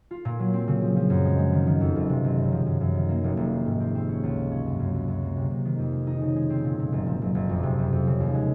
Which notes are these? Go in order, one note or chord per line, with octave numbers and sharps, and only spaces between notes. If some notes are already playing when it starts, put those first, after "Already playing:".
F4
A#2
F#3
C4
C#3
F3
F3
F#2
G#3
G#3
D#3
D#3
F2
F#1
C3
F#1
F#2
F3
F#2
F#2
D#3
A#3
F1
F1
C4
G#2
C4
C4
C#4
C#2
G#3
C#4
F#2
F#2
F#2
F#2
A#3
C3
C3
D#3
F2
G#3
D#4
C#3
G#3
C4
A#2
A#2
F#1
F3
F#1
F#1
F2
C3
F2
F2
C#3
D#2
G#3